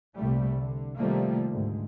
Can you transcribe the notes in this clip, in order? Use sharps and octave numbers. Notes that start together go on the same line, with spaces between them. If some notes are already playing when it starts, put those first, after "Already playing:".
C2 A#2 G3 A3
D3
C3 D#3 F3 G3 A3 A#3
D2 G#2